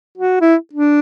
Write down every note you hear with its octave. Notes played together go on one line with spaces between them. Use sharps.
F#4
E4
D4